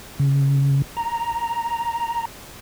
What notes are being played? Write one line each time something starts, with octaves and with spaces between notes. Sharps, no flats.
C#3
A#5